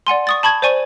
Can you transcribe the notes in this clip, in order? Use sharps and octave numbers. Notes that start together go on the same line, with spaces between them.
D5 F#5 G#5 C6
C#6 D#6 A6
A5 B5 C#6 G#6
C5 D5 G#5 C#6